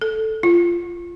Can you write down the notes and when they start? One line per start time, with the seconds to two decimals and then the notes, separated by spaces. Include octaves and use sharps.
0.01 A4
0.43 F4